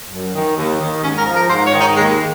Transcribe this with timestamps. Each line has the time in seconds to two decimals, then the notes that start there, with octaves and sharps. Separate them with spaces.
0.10 F#2
0.34 D#3
0.57 D#2
0.80 D#3
1.03 G#2 C#4
1.18 A#4
1.26 F3
1.35 A#4
1.49 G#2 C5
1.66 C#5
1.74 D#3
1.81 D#4
1.96 D#2 G#3